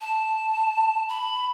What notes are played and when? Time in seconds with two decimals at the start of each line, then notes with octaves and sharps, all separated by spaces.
0.01 A5
1.09 B5